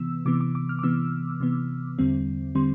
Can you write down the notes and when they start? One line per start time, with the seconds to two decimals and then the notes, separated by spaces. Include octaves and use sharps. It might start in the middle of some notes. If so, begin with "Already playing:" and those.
Already playing: C3 E3 B3 E6
0.26 C3 E3 B3 D6
0.41 D6
0.55 D6
0.69 F6
0.79 D6
0.83 C3 E3 B3 E6
1.40 C3 E3 B3
1.99 E2 D3 G3 C4
2.55 D3 G3 C4 C6